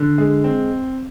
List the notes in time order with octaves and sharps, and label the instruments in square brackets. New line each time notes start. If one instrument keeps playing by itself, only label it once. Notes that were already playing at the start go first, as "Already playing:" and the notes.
Already playing: [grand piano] D3
G#3
C4